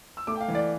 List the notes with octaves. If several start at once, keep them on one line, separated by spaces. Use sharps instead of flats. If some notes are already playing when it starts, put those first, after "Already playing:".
E6
A3 D6
G5
F5
E3
D5